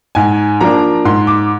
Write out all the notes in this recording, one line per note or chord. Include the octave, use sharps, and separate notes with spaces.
G#2 G#5
F3 A#3 D4 A#5
G#2 C6
D6